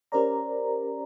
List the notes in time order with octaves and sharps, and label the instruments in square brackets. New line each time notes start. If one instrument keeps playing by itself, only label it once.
[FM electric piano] C#4 G4 A#4 C5 D5 A#5